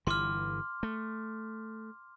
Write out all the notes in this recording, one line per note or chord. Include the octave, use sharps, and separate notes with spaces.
G1 E3 C6 D6 F6
A3